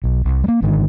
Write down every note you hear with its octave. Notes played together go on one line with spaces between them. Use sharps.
B1
C2
G3 A#3
G#1 G#2 D3 D#3